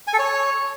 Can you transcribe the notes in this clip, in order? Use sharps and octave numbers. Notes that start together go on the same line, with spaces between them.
G#5
A4
C#5